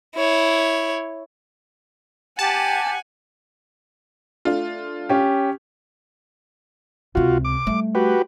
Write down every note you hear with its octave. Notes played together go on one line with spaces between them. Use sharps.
E4 C#5
G4 F#5 G#5 A5
A3 D4 F4
C#4 G4
C#2 C3 F4 F#4
D6
G3 A3
F#4 G4 B4